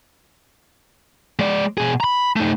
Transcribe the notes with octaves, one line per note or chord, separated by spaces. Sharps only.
G#3 D5
B2 G#4
A#5 B5
A3 D#4